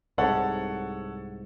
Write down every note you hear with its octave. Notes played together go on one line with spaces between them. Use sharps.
C2 G#2 A4 C#5 F#5